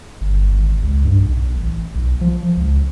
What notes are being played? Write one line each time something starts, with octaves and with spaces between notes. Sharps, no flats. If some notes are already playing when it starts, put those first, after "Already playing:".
G1
G#1
C#2
G2
B1
A1
B1
F3
C#2